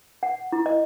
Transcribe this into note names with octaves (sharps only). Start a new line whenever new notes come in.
F#5
E4
D#5